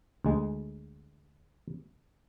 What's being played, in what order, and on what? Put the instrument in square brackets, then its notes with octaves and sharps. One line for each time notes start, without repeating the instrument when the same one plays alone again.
[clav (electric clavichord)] D2 G#3